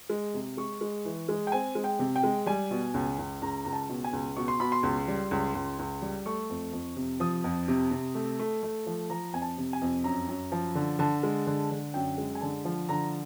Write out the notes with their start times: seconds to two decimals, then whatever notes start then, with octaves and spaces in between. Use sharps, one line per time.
0.10 G#3
0.34 C3
0.57 G#3 C#6
0.81 G#3
1.05 E3
1.29 G#3
1.47 G5
1.52 C4 G#5
1.75 G#3
1.84 G5
1.99 C3
2.16 G5
2.23 G#3
2.46 G3 G#5
2.71 B2
2.94 C#2
3.19 C#2
3.42 C#2 A#5
3.65 C#2 A#5
3.73 A5
3.89 B2
4.04 G#5
4.13 C#2
4.36 B2 C#6
4.48 C6
4.60 B2 B5
4.72 C6
4.83 C#2
5.08 G3
5.31 C#2
5.55 C#2
5.79 C#2
6.02 G3
6.26 A3 C#6
6.49 F2
6.73 F2
6.96 C3
7.20 F3 D#6
7.44 F2
7.68 C3
7.91 C3
8.15 A3
8.39 A3
8.63 A3
8.86 F3
9.10 F3 A#5
9.33 F2 G#5
9.42 A5
9.58 C3
9.73 G#5
9.81 F2
10.04 F#2 A#5
10.28 F#2
10.52 F3
10.75 D3
10.99 D3 A5
11.23 G#3
11.47 D3
11.71 D3
11.94 F#2 G5
12.18 G#3
12.35 G#5
12.41 D3 A5
12.65 F3
12.89 D3 A#5